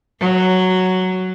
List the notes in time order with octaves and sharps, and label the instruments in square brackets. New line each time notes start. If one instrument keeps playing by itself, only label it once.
[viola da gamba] F#3